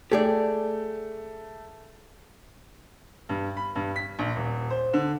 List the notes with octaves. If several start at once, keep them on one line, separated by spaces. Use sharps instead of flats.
A3 G4 G#4 D5
G2
B5
G2
B6
A#1
D#1
C5
D3